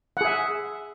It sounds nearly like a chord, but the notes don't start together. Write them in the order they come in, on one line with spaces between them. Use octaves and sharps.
F#5 G#4 E5